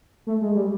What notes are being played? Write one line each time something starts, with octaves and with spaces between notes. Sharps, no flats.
A3
G#3
G3